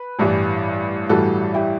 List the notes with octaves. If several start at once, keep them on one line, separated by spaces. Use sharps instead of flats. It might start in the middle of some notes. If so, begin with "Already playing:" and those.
Already playing: B4
A1 G2 E3 G3
A1 G2 E3 G3 F#4 A4
E4 G4